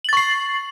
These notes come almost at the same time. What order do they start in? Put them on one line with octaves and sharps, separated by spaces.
F#7 A6 C#6 C7